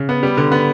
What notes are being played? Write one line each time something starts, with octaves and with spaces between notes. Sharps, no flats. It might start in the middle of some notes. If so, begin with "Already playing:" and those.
Already playing: C#3
B3
G3
D3
B3